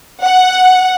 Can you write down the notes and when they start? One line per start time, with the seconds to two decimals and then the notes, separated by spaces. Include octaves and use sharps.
0.22 F#5